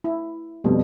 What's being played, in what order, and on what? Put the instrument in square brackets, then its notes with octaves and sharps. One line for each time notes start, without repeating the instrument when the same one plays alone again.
[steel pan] E4
[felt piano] F2 B2 [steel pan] G3